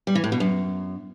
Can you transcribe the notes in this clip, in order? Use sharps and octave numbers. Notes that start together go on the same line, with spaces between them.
G3
E3
A2
B2
F#2